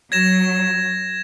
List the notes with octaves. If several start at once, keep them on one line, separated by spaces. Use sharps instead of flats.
F#3 G#6 A#6 E7